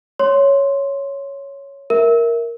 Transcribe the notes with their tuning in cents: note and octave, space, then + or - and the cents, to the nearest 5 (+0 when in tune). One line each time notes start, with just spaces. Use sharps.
C#5 +0 C6 +0
A#4 +0 E5 -5